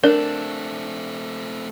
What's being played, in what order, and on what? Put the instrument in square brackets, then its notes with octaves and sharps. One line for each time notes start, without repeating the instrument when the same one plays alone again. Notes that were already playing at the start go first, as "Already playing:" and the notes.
[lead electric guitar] A3 C4 [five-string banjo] D4 [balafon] A#4